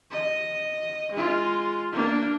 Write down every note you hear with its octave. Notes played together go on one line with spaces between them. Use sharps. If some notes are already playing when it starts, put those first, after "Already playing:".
D#5
G#3 F4
A#3 D4